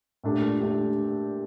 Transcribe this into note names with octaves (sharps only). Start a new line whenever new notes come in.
A#2 A3 D4 G4
A3 D4 G4